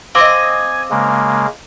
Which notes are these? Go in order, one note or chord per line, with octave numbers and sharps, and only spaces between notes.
C4 D#5 F5 G#5 D6
C#3 G#3 A#3